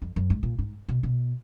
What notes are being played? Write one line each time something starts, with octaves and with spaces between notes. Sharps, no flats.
F2
F#2
G#2
A#2
G#2
B2
B2